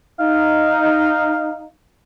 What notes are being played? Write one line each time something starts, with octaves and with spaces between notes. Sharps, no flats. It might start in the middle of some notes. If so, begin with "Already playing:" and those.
D#4 F5